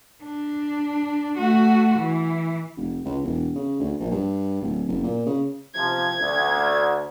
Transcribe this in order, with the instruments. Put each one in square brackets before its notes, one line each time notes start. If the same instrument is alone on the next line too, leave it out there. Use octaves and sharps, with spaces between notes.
[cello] D4
A3 F#4
E3
[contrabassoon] F1
C#2
E1
C#3
D2
A#1
G2
D1
F#1
A#2
C#3
[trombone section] C3 F3 [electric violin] G#6
[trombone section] D2